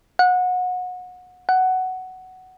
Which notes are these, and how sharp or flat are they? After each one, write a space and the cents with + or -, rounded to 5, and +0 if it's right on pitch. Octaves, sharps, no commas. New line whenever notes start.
F#5 -25
F#5 +10